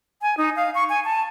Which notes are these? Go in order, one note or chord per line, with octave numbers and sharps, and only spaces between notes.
G#5
D#4
F5
C#6
G#5
A5